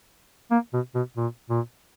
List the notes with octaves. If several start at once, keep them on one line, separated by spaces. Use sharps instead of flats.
A#3
B2
B2
A#2
A#2